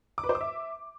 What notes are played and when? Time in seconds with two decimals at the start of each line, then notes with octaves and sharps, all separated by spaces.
0.18 D6
0.24 B4
0.29 C5
0.35 D6
0.41 E5